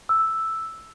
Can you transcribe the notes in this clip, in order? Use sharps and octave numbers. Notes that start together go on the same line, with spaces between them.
E6